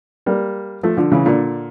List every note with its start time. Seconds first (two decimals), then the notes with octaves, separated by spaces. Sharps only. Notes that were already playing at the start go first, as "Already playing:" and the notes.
0.26 G3 A#3
0.83 F3 A3
0.97 D3 F3
1.12 C#3 E3
1.26 A#2 D3